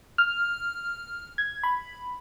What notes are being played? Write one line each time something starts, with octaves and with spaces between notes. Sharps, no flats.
F6
G#6
B5